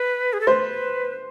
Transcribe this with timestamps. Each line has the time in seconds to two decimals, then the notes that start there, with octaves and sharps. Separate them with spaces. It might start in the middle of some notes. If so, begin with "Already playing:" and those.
Already playing: B4
0.33 G#4
0.41 A4
0.47 B4 C5